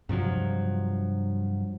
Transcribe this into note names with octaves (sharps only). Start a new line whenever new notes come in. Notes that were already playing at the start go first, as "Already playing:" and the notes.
G2 C3 F3 F#3